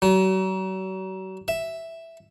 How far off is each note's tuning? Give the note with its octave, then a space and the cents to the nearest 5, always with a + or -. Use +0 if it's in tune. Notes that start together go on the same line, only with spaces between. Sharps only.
F#3 +40
E5 +0